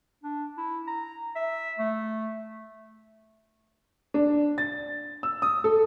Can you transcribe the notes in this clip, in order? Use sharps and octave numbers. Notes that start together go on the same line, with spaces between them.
D4
E4
A#5
E5
A3
D4
A6
E6
D#6
A4